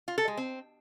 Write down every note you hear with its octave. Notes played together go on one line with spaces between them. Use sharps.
F4
A4
G#3
C4